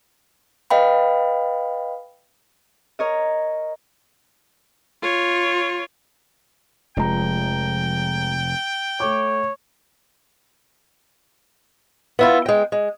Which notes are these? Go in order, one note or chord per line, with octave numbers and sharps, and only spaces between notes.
B4 D#5 F5 G5 B5
A#4 C#5 D#5
F4 C#5
F1 F3 G#3 G5 A#5
A3 C#5 D6
B3 E4 F4
G#3 G5
G#3